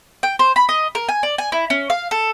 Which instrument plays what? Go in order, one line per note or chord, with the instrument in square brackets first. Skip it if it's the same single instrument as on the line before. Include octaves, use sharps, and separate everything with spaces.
[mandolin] G5
C5
B5
D#5
A#4
G#5
D5
G#5
E4
C#4
F5
A4